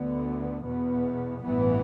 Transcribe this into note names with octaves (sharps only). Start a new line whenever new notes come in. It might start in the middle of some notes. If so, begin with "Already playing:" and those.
Already playing: D2 D3 B3
E2 B2 B3
A1 G2 E3 B3